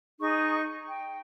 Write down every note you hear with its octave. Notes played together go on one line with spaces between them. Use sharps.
D#4 G#4 C#6
G5